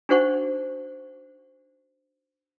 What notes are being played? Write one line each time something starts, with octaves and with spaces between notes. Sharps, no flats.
D4 D#4 F#4 C5 F#5 C#6